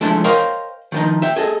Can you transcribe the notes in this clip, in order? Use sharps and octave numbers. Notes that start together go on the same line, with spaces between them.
E3 F3 G#3 A3 D4
A#4 C5 C#5 D#5 F5 G5
D#3 F3 D#4
E5 G5
G#4 A4 D#5